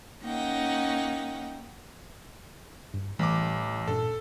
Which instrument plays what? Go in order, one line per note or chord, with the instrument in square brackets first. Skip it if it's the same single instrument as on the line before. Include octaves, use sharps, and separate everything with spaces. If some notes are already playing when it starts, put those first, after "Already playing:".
[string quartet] A#3 C#4 D#4 F#5 G5
[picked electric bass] G2
[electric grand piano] A1 D6 [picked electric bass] A2 E3 G3
[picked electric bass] G2 A#2 D4 [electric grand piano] A4